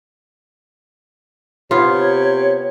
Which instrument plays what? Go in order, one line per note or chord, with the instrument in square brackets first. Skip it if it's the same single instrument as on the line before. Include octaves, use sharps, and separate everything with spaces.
[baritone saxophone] C3 [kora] B3 F4 [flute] C#5